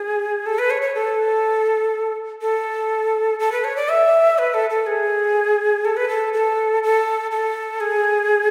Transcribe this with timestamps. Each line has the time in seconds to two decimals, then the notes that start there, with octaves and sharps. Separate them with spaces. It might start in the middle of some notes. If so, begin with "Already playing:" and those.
Already playing: G#4
0.46 A4
0.59 B4
0.70 C#5
0.82 C#5
0.95 A4
2.41 A4
3.39 A4
3.52 B4
3.64 C#5
3.76 D5
3.89 E5
4.38 B4
4.54 A4
4.70 A4
4.86 G#4
5.85 A4
5.97 B4
6.09 A4
6.33 A4
6.83 A4
7.31 A4
7.80 G#4